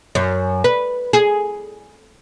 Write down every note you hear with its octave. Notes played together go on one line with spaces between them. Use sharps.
F#2
B4
G#4